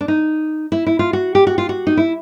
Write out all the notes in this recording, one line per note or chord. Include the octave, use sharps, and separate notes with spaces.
D4
D#4
E4
E4
F4
F#4
G4
F#4
F4
F#4
D#4
E4